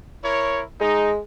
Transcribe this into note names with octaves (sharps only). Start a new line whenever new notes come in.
E4 A#4 C#5
G#3 D#4